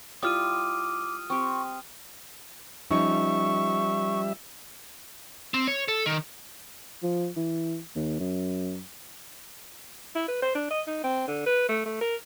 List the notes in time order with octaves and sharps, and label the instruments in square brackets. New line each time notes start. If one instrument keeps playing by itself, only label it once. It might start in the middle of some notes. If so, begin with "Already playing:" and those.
[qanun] G3 E4 F4 [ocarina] D6 [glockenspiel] D#6 F6 D#7
[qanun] C4 G4 [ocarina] C#6
[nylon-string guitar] F3 C#4 D#4 [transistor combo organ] G3 E5 [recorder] C#6
[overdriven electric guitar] C4
C#5
A4
D#3
[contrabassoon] F3
E3
D#2
F#2
[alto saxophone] E4
B4
C5
D4
D#5
D#4
C4
D3
B4
A3
A3
A#4